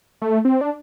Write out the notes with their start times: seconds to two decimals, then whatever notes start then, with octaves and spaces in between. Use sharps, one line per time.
0.22 A3
0.45 C4
0.61 D4